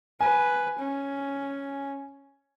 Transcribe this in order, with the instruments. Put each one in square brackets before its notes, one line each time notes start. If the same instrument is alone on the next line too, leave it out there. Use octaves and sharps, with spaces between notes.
[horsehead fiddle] B4 [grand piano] G#5
[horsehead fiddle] C#4